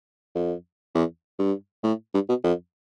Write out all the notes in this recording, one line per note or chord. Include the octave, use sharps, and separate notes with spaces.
F2
E2
G2
A2
G2
B2
F2